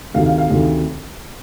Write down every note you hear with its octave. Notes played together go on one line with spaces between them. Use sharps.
D2 C3 D#3 F5
F5
F5
D2 C3 D#3